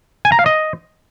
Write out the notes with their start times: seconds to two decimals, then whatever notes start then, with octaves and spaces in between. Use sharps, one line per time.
0.25 G#5
0.32 A#5
0.39 F5
0.46 D#5